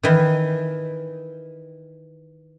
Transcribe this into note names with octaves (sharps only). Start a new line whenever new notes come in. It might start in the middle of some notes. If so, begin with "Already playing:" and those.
D#3 E3